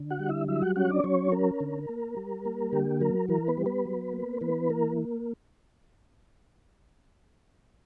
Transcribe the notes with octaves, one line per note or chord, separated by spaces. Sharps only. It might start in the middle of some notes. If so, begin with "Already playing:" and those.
Already playing: D3
F#4 F#5
G3
E4 E5
F#3 E4 E5
F#4 F#5
C#4 F#4 F#5
D4 D5
F#3 C#4 C#5
C#4 A#4
D3
A#3
G3
A#3
D3 G4
F#3 A#4
E3 A#4
B3 B4
G3
B3 B4
F#3
A#3
E3 B3 B4
A#3 A#4